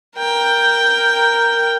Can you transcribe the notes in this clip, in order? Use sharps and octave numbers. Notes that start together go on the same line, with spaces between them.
A#4 G5